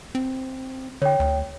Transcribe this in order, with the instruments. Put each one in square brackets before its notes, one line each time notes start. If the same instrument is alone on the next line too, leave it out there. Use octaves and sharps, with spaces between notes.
[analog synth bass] C4
[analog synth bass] D3 [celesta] C#5 G5
[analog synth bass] D2